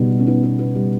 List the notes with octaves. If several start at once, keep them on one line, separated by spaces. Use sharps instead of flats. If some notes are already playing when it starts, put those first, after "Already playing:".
Already playing: B2 G3 B3 D#4
G3
C#4
B3 D#4
B3
B3
G3